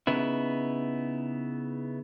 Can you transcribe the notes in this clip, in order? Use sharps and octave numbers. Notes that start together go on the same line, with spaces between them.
C#3 B3 D#4 E4